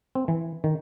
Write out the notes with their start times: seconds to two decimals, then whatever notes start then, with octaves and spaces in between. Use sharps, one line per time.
0.15 C4
0.28 E3
0.64 D#3